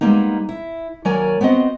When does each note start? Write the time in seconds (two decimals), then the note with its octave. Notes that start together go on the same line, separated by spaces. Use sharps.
0.01 G3 G#3 A#3 B3 D#4
0.49 E4
1.05 D#2 F#3 A#4 C#5 D5 G#5
1.41 B3 C4 F#4 D#5 F#5